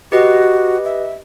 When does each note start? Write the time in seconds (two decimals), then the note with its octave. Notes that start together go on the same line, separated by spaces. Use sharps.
0.12 F#4 G4 B4 D#5
0.85 E5